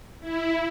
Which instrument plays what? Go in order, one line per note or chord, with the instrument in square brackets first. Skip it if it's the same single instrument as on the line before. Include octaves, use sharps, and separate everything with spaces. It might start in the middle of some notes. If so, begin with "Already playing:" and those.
[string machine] E4